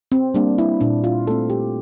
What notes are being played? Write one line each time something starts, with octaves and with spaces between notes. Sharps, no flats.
C4
G3 A#3 D4
E4
A#2 D4
F4
A3 C4 A4
G4